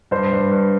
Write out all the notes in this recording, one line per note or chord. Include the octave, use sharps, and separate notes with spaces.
G2 C5
G2
G2